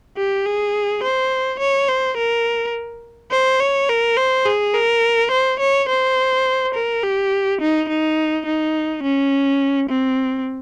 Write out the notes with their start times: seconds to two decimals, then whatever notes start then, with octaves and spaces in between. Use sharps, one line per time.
0.17 G4
0.45 G#4
1.03 C5
1.59 C#5
1.88 C5
2.17 A#4
3.31 C5
3.60 C#5
3.89 A#4
4.17 C5
4.46 G#4
4.74 A#4
5.31 C5
5.59 C#5
5.88 C5
6.75 A#4
7.03 G4
7.61 D#4
7.89 D#4
8.46 D#4
9.02 C#4
9.89 C4